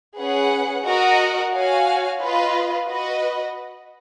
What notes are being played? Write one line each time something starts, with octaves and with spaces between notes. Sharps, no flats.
C#4 G#4 B4 F#5
F#4 A#4 D#5 F#5
F#4 C#5 F5 G#5
F4 B4 D#5
F#4 B4 D#5